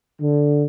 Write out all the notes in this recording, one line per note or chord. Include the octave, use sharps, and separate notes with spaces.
D3